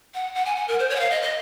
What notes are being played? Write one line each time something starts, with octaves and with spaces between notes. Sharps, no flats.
F#5
F#5
G#5
F#5
A#4
C5
C#5
F#5
F5
D#5
D#5